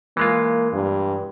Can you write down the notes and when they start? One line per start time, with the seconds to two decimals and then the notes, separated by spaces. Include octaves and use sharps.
0.17 E3 G#3 A#3 F4
0.73 G2